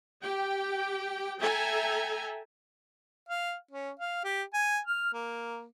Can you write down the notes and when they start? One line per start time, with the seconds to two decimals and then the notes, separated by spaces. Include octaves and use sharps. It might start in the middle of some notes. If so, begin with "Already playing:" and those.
0.22 G4 G5
1.40 A4 E5 G5 G#5 A#5
3.29 F5
3.71 C#4
3.99 F5
4.24 G4
4.54 G#5
4.87 F6
5.13 A#3